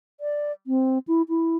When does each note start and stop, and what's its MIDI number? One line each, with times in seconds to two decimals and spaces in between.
0.20 0.52 74
0.67 0.98 60
1.07 1.22 64
1.29 1.57 64